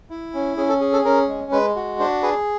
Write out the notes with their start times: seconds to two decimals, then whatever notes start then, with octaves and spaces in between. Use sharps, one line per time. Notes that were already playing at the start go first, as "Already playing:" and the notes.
0.10 E4
0.34 C#4
0.57 C#4 G#4
0.69 A4
0.81 G#4
0.93 A4
1.05 C#4 A#4
1.28 G#3
1.52 G#3 B4
1.76 F#4
1.99 D4 C5
2.23 G#4 B4